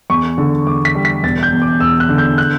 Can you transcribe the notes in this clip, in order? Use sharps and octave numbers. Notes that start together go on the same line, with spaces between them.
E2 C#6
D3
E2 D6
B6
G3
B6
E1 A6
G6
E2
D6
E1 E6
F#6
D3
G6
F#6